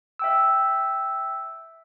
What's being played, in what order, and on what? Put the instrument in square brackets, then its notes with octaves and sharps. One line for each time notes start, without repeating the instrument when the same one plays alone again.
[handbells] E5 G5 E6